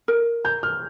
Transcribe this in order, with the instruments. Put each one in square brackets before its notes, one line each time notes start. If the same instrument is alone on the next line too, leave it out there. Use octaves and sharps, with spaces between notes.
[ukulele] A#4
[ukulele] A#5 [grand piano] G6
[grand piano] F6